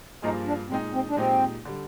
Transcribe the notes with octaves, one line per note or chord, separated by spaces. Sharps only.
G2 F3 A#3 D#4 F4 G#4
D4
A#2 G#3 C4 D#4
C4
D4
A#2 G#3 C4 D#4 G4
D3 G3